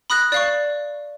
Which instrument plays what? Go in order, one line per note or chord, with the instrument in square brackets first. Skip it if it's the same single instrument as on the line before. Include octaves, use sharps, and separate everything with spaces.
[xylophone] B5 D#6 F#6 A#6
D5 F5 C#6